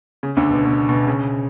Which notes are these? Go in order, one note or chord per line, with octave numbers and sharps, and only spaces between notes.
C#3
D2 D3
B2
B2
B2
C#3